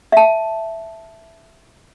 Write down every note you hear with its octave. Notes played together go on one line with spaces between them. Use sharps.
E5 A5